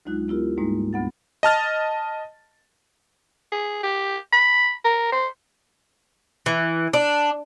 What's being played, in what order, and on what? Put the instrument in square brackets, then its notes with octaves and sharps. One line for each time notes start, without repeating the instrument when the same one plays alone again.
[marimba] D2 F#3 G#3 D#4 F4 F#6
B3 E4 F4 G4 A#4
G#2 G3 G#3 A#3 D#4
D2 B2 B3 F#5 A6
[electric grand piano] D#5 A5 F6 A6
[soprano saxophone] G#4
G4
B5
A#4
C5
[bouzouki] E3
D4